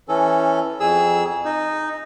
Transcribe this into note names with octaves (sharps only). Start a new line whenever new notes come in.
E3 C#4 A4
F2 G#4 E6
D#4